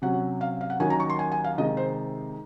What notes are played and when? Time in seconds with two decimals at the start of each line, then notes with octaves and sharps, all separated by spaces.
0.02 C3 F#3 C#4 F#5
0.41 F5
0.61 F5
0.70 F#5
0.80 D#2 D#3 F#3 C#4 G#5
0.90 A#5
1.00 C#6
1.10 C6
1.19 G#5
1.32 G#5
1.44 F5
1.58 C3 D#3 G#3 D#5
1.77 C5